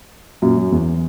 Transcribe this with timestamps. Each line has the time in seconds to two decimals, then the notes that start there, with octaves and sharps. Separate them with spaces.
0.42 F#2 A#2
0.57 F#2
0.72 E2